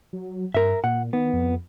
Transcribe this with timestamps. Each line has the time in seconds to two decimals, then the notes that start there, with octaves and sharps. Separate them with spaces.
0.13 F#3
0.54 G2 A#4 E5
0.84 A#2 F#5
1.13 D#3 B3
1.34 F2